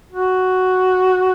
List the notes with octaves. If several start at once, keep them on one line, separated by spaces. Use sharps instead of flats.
F#4